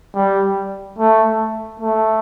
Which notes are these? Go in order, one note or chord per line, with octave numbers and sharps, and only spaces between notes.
G3
A3
A3